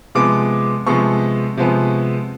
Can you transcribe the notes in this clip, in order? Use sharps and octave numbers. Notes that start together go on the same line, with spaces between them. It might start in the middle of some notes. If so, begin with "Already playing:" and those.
C3 F3 G#3 B3 D6
C3 F3 G#3 B3 C#6
C3 F3 G#3 B3